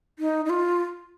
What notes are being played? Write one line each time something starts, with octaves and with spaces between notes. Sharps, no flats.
D#4
D#4
F4